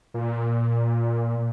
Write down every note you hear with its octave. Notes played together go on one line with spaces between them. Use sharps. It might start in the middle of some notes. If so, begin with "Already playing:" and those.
A#2